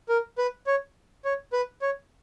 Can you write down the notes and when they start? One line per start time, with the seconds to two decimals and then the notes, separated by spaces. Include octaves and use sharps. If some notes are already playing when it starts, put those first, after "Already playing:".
0.09 A#4
0.38 B4
0.67 C#5
1.25 C#5
1.53 B4
1.82 C#5